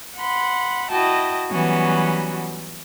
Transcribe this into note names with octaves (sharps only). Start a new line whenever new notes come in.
F#5 B5 C6
E4 F#4 D#5 G5 A5
E3 F#3 G3 B3 C#4 F#4